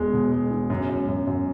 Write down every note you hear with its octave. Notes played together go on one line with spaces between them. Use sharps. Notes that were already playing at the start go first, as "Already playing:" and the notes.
Already playing: E1 B2 G#3
B2
G#3
E1
F#2
F#2
F#2
F#2